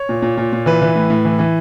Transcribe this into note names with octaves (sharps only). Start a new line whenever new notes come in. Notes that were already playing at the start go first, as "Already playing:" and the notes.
Already playing: C#5
A#2
A#2
A#2
A#2
E3 B4
E3
A2
A2
E3
E3